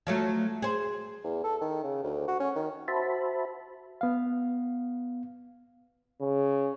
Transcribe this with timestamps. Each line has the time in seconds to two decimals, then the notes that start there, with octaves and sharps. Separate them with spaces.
0.07 F3 F#3 A3
0.62 G#4 C5
1.24 E2
1.44 A4
1.61 D#3
1.84 C#3
2.04 D2
2.28 F#4
2.40 C#4
2.55 D#3
2.88 F#4 C5 E5 A5 B5
4.01 B3 F5
6.21 C#3